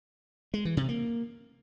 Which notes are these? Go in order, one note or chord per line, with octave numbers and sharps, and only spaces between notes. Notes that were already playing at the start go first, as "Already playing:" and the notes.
G#3
E3
C3
A#3